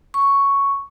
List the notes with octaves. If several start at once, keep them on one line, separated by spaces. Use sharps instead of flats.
C#6